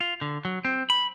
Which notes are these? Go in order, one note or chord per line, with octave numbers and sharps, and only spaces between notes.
F4
D3
F#3
C4
B5